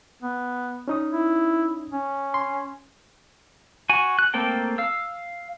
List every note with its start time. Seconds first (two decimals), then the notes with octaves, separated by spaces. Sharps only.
0.23 B3
0.88 C#4 D#4 D#6
1.12 E4
1.92 C#4
2.34 C6
3.90 F#4 G#5
4.19 F#6
4.34 A3 A#3 C4 A4 G5
4.78 F5 E6